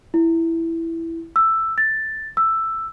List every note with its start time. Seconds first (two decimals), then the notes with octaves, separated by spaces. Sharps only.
0.14 E4
1.36 E6
1.78 A6
2.37 E6